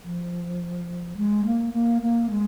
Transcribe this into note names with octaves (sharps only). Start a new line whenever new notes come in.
F3
G#3
A#3
A#3
A#3
G#3